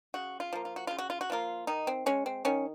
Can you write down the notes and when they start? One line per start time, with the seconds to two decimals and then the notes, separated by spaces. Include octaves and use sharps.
0.14 C#3 F#4
0.40 F4
0.53 F3 A#3
0.65 F4
0.76 F#4
0.87 C#3 F4
0.98 F#4
1.10 F4
1.21 F#4
1.30 F3 A#3 F4
1.67 D#3 D#4
1.87 C4
2.06 G#3 C#4
2.26 C4
2.45 D#3 C#4